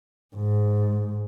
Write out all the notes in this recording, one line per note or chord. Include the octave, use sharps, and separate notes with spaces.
G#2